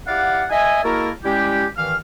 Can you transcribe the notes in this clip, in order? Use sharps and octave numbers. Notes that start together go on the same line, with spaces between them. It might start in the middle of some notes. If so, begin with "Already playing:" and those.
E4 G4 D5 F5 F#5
D#5 E5 G#5
G#3 A#3 E4 F#4 A4 A#4
G3 G#3 C#4 E4 G4
G2 D#3 E3 F5 F6